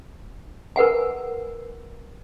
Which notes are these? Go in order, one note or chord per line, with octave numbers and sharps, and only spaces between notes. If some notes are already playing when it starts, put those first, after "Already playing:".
A#4 B4 F#5 G#5